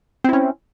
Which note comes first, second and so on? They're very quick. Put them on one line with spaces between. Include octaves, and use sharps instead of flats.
C4 E4 C#4